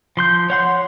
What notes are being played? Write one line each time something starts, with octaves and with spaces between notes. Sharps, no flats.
F3 C6 G6
C#5 F#5 C6